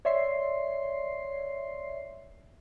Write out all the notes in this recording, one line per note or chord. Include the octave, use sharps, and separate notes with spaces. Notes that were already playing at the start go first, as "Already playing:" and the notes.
C#5 D5 E5 C6 C7